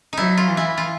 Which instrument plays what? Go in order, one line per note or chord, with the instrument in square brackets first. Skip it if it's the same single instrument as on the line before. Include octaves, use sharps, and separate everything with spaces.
[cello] F#3 [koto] D#4 E4
[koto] F4
[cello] E3
[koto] E4
F4